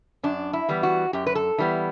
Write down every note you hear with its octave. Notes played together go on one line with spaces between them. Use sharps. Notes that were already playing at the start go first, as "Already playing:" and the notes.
F#2 D4
E4
E3 G3 B3
F#4
F#2 G4
B4
A4
E3 G3 B3